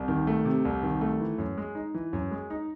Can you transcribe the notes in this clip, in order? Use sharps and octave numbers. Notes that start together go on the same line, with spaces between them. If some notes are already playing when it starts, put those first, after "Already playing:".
Already playing: C2
D#3
A3
C3
C2
D#3
A3
E3
F#2
G#3
D#4
E3
F#2
G#3
D#4